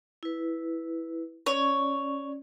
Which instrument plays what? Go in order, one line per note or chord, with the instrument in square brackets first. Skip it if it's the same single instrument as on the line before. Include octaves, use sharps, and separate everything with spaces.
[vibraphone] E4 B4
[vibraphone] C#4 D5 [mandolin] C#5